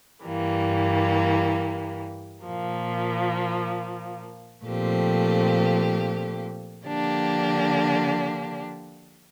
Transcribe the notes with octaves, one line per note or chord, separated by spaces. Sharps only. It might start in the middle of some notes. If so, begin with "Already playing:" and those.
G2 E3 G3 A#3
A#2 F3 A#3
A#2 F3 A3 C4 G4
D3 F3 A#3 D4 G4